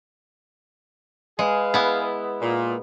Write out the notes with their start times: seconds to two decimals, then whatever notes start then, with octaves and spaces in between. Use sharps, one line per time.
1.39 G#3 G#4 B4 F5
1.74 B3 E4
2.42 A#2